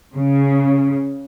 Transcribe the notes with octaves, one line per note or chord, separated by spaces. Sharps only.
C#3